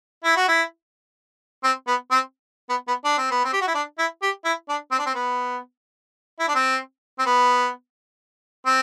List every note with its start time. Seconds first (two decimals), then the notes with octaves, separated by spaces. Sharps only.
0.24 E4
0.36 F#4
0.48 E4
1.64 C4
1.87 B3
2.11 C4
2.70 B3
2.87 B3
3.05 D4
3.18 C4
3.31 B3
3.44 C4
3.53 G4
3.61 F#4
3.67 E4
3.75 D4
3.98 E4
4.22 G4
4.45 E4
4.69 D4
4.92 C4
4.99 D4
5.06 C4
5.15 B3
6.39 E4
6.48 D4
6.55 C4
7.19 C4
7.26 B3
8.66 C4